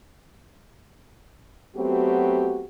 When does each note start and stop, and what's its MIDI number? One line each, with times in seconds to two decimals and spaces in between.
1.76 2.67 54
1.76 2.67 57
1.76 2.67 59
1.76 2.67 60
1.76 2.67 66
1.76 2.67 67